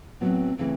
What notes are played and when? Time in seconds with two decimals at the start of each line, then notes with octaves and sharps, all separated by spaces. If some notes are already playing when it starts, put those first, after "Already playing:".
0.21 A2 F#3 B3 C4
0.58 C#3 E3 A3 C4